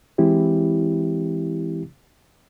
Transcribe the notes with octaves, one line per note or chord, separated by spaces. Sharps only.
E3 G#3 C4 E4 G4